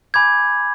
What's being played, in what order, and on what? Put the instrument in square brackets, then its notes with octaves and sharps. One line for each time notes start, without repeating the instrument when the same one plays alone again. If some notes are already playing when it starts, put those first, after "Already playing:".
[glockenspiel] G#5 B5 D6 G6 G#6